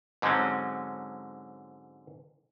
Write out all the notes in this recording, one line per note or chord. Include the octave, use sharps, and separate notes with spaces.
G#2 D3 F#3 G#3 C4 C#4